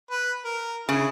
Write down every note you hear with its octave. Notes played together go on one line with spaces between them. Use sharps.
B4
A#4
C#3 E4 G#4